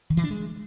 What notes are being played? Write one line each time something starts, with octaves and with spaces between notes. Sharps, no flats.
D#3
E3
D4
G#3